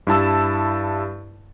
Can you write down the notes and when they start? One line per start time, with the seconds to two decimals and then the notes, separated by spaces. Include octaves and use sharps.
0.07 G2 E4 A5 E6